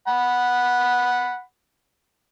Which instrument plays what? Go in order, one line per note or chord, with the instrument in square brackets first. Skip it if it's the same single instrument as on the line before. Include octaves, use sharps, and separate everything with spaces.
[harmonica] F#5 B5